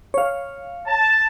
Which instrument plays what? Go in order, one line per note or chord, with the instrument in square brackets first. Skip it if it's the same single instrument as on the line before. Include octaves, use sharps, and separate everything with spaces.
[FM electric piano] C#5 F5
[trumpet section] A5